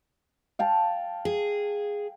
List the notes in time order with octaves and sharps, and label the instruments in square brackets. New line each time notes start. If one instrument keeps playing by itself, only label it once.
[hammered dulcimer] F5 G5 A5
[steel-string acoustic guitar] G#4